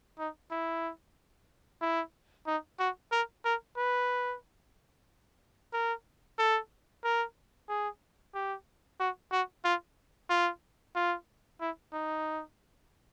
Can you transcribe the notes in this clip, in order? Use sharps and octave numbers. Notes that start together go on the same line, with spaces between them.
D#4
E4
E4
D#4
F#4
A#4
A#4
B4
A#4
A4
A#4
G#4
G4
F#4
F#4
F4
F4
F4
E4
D#4